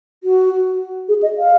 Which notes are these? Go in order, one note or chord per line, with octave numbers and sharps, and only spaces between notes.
F#4
G#4
D#5
F5